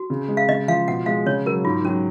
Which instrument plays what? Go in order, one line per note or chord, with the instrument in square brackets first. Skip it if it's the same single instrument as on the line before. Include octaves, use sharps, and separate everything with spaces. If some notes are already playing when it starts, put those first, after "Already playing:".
Already playing: [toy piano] F#4
[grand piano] C#3
G#3
[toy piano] F5
[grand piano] C#3 [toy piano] D#5
[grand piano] F3 [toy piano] F5
[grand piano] B2 [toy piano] F#5
[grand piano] G#3 [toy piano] F5
[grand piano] C#3 [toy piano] C#5
[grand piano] F#3 [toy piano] A#4
[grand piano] G#2 [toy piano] F4
[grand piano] F#3 [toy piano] C#4